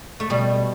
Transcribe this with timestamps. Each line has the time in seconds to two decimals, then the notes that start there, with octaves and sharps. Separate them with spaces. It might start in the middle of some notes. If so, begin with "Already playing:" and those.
0.20 A3
0.30 B2 G3